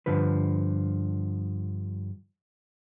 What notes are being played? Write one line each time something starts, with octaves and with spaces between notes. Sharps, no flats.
G2 D3 F3 B4